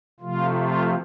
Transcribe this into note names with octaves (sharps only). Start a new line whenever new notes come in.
C3 F3 A3 F4
F4